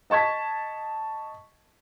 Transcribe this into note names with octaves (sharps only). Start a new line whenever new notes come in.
D#5 A5 C#6 G#6 B6